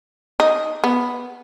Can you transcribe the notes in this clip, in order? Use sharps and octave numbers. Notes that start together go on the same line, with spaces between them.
D#4
B3